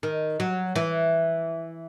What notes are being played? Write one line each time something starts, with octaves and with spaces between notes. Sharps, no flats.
D#3
F#3
E3